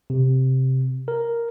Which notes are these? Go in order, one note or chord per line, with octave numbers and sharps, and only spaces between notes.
C3
A#4